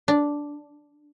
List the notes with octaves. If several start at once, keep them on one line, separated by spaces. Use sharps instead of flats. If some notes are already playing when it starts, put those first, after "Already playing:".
D4